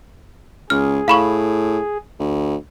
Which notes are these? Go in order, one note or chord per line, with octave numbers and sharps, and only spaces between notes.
C#2 G#4 F6
A2 F5 B5 C#6
D2